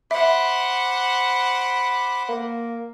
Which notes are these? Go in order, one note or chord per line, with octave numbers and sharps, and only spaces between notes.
C5 E5 F#5 B5 D6
A#3